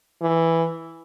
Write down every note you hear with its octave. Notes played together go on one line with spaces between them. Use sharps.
E3